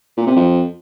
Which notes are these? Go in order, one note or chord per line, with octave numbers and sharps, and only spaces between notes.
A#2
C3
F2